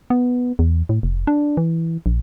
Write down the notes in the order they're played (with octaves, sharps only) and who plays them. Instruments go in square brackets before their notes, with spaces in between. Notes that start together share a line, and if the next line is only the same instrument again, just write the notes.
[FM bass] B3
E2
A2
F1
D4
E3
A#1